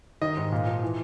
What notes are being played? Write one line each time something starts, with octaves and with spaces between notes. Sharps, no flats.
D#3 D#5
G#2
A#2
F3
E3